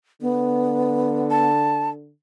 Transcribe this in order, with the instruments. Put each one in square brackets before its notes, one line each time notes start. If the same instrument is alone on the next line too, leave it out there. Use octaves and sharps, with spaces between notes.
[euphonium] D3 [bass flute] B3
[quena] A5